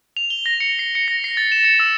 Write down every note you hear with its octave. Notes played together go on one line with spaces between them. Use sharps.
F7
G7
A#6
C#7
C7
C#7
A#6
C7
A6
E7
C#7
E6